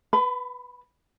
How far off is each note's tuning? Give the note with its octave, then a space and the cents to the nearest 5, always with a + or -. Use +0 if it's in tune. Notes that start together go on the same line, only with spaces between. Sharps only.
B4 -5 B5 +35